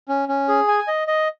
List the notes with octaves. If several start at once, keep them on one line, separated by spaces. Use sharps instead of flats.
C#4
C#4
G#4
G#5
D#5
D#5